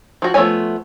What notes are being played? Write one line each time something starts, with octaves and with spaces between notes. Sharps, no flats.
F3 F#4
F3 A3 B3 C#5 G#5